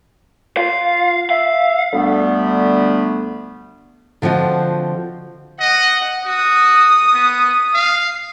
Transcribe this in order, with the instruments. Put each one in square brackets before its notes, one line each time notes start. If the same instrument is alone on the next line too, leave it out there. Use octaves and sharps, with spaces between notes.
[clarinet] F4 [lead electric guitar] F5
[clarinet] E5 [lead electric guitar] F5
[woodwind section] D2 D3 G3 A3 B3
[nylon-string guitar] D3 F3 C4 F#4 D#5
[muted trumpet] D#5 [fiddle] F#5
[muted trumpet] F#4 [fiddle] D#6
[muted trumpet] B3
F5